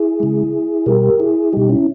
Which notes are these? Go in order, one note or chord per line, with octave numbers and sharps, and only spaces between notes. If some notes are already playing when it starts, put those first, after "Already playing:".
Already playing: E4 G#4
C#3 G#3
B2 G3 G4 A#4
E4 G#4
B2 G3 D#4 G4
C#4 E4